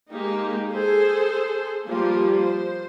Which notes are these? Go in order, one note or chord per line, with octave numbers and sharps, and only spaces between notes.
G#3 A#3 D#4 G4
G#4 A4 C5
F3 G3 A#3 F4 G4
C5